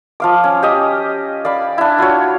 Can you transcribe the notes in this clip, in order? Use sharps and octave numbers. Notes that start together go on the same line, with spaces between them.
F3 F5 D6
C#4
G4 D#5
D5 F5 B5
D4 E4
F4 F#4 C#5